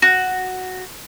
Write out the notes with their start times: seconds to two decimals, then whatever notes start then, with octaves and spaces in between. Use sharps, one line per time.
0.02 F#4